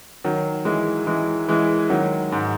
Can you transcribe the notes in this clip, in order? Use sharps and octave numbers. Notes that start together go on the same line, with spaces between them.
D#3 F#3
E3 G#3
E3 G#3
E3 G#3
D#3 F#3
G#2